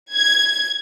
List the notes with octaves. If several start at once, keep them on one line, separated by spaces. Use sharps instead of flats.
G#6